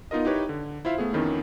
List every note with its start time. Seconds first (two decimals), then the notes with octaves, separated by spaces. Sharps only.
0.11 B3 D#4 F4 A#4 D#5
0.25 D#4 E4 G4 B4 C#5
0.49 D3
0.85 E4 F4 C5 E5 F5
0.98 A3 B3 G#4
1.13 F2 D#3 E3 B3 C#4